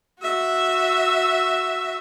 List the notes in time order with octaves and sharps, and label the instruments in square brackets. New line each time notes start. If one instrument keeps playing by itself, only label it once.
[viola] F#4 E5